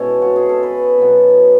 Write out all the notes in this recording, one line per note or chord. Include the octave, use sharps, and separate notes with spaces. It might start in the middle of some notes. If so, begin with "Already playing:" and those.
Already playing: B2 G#3 C#4 E4 A4 C#5 D#5
F#4
G#4
A4
B4
B2 F#3 B3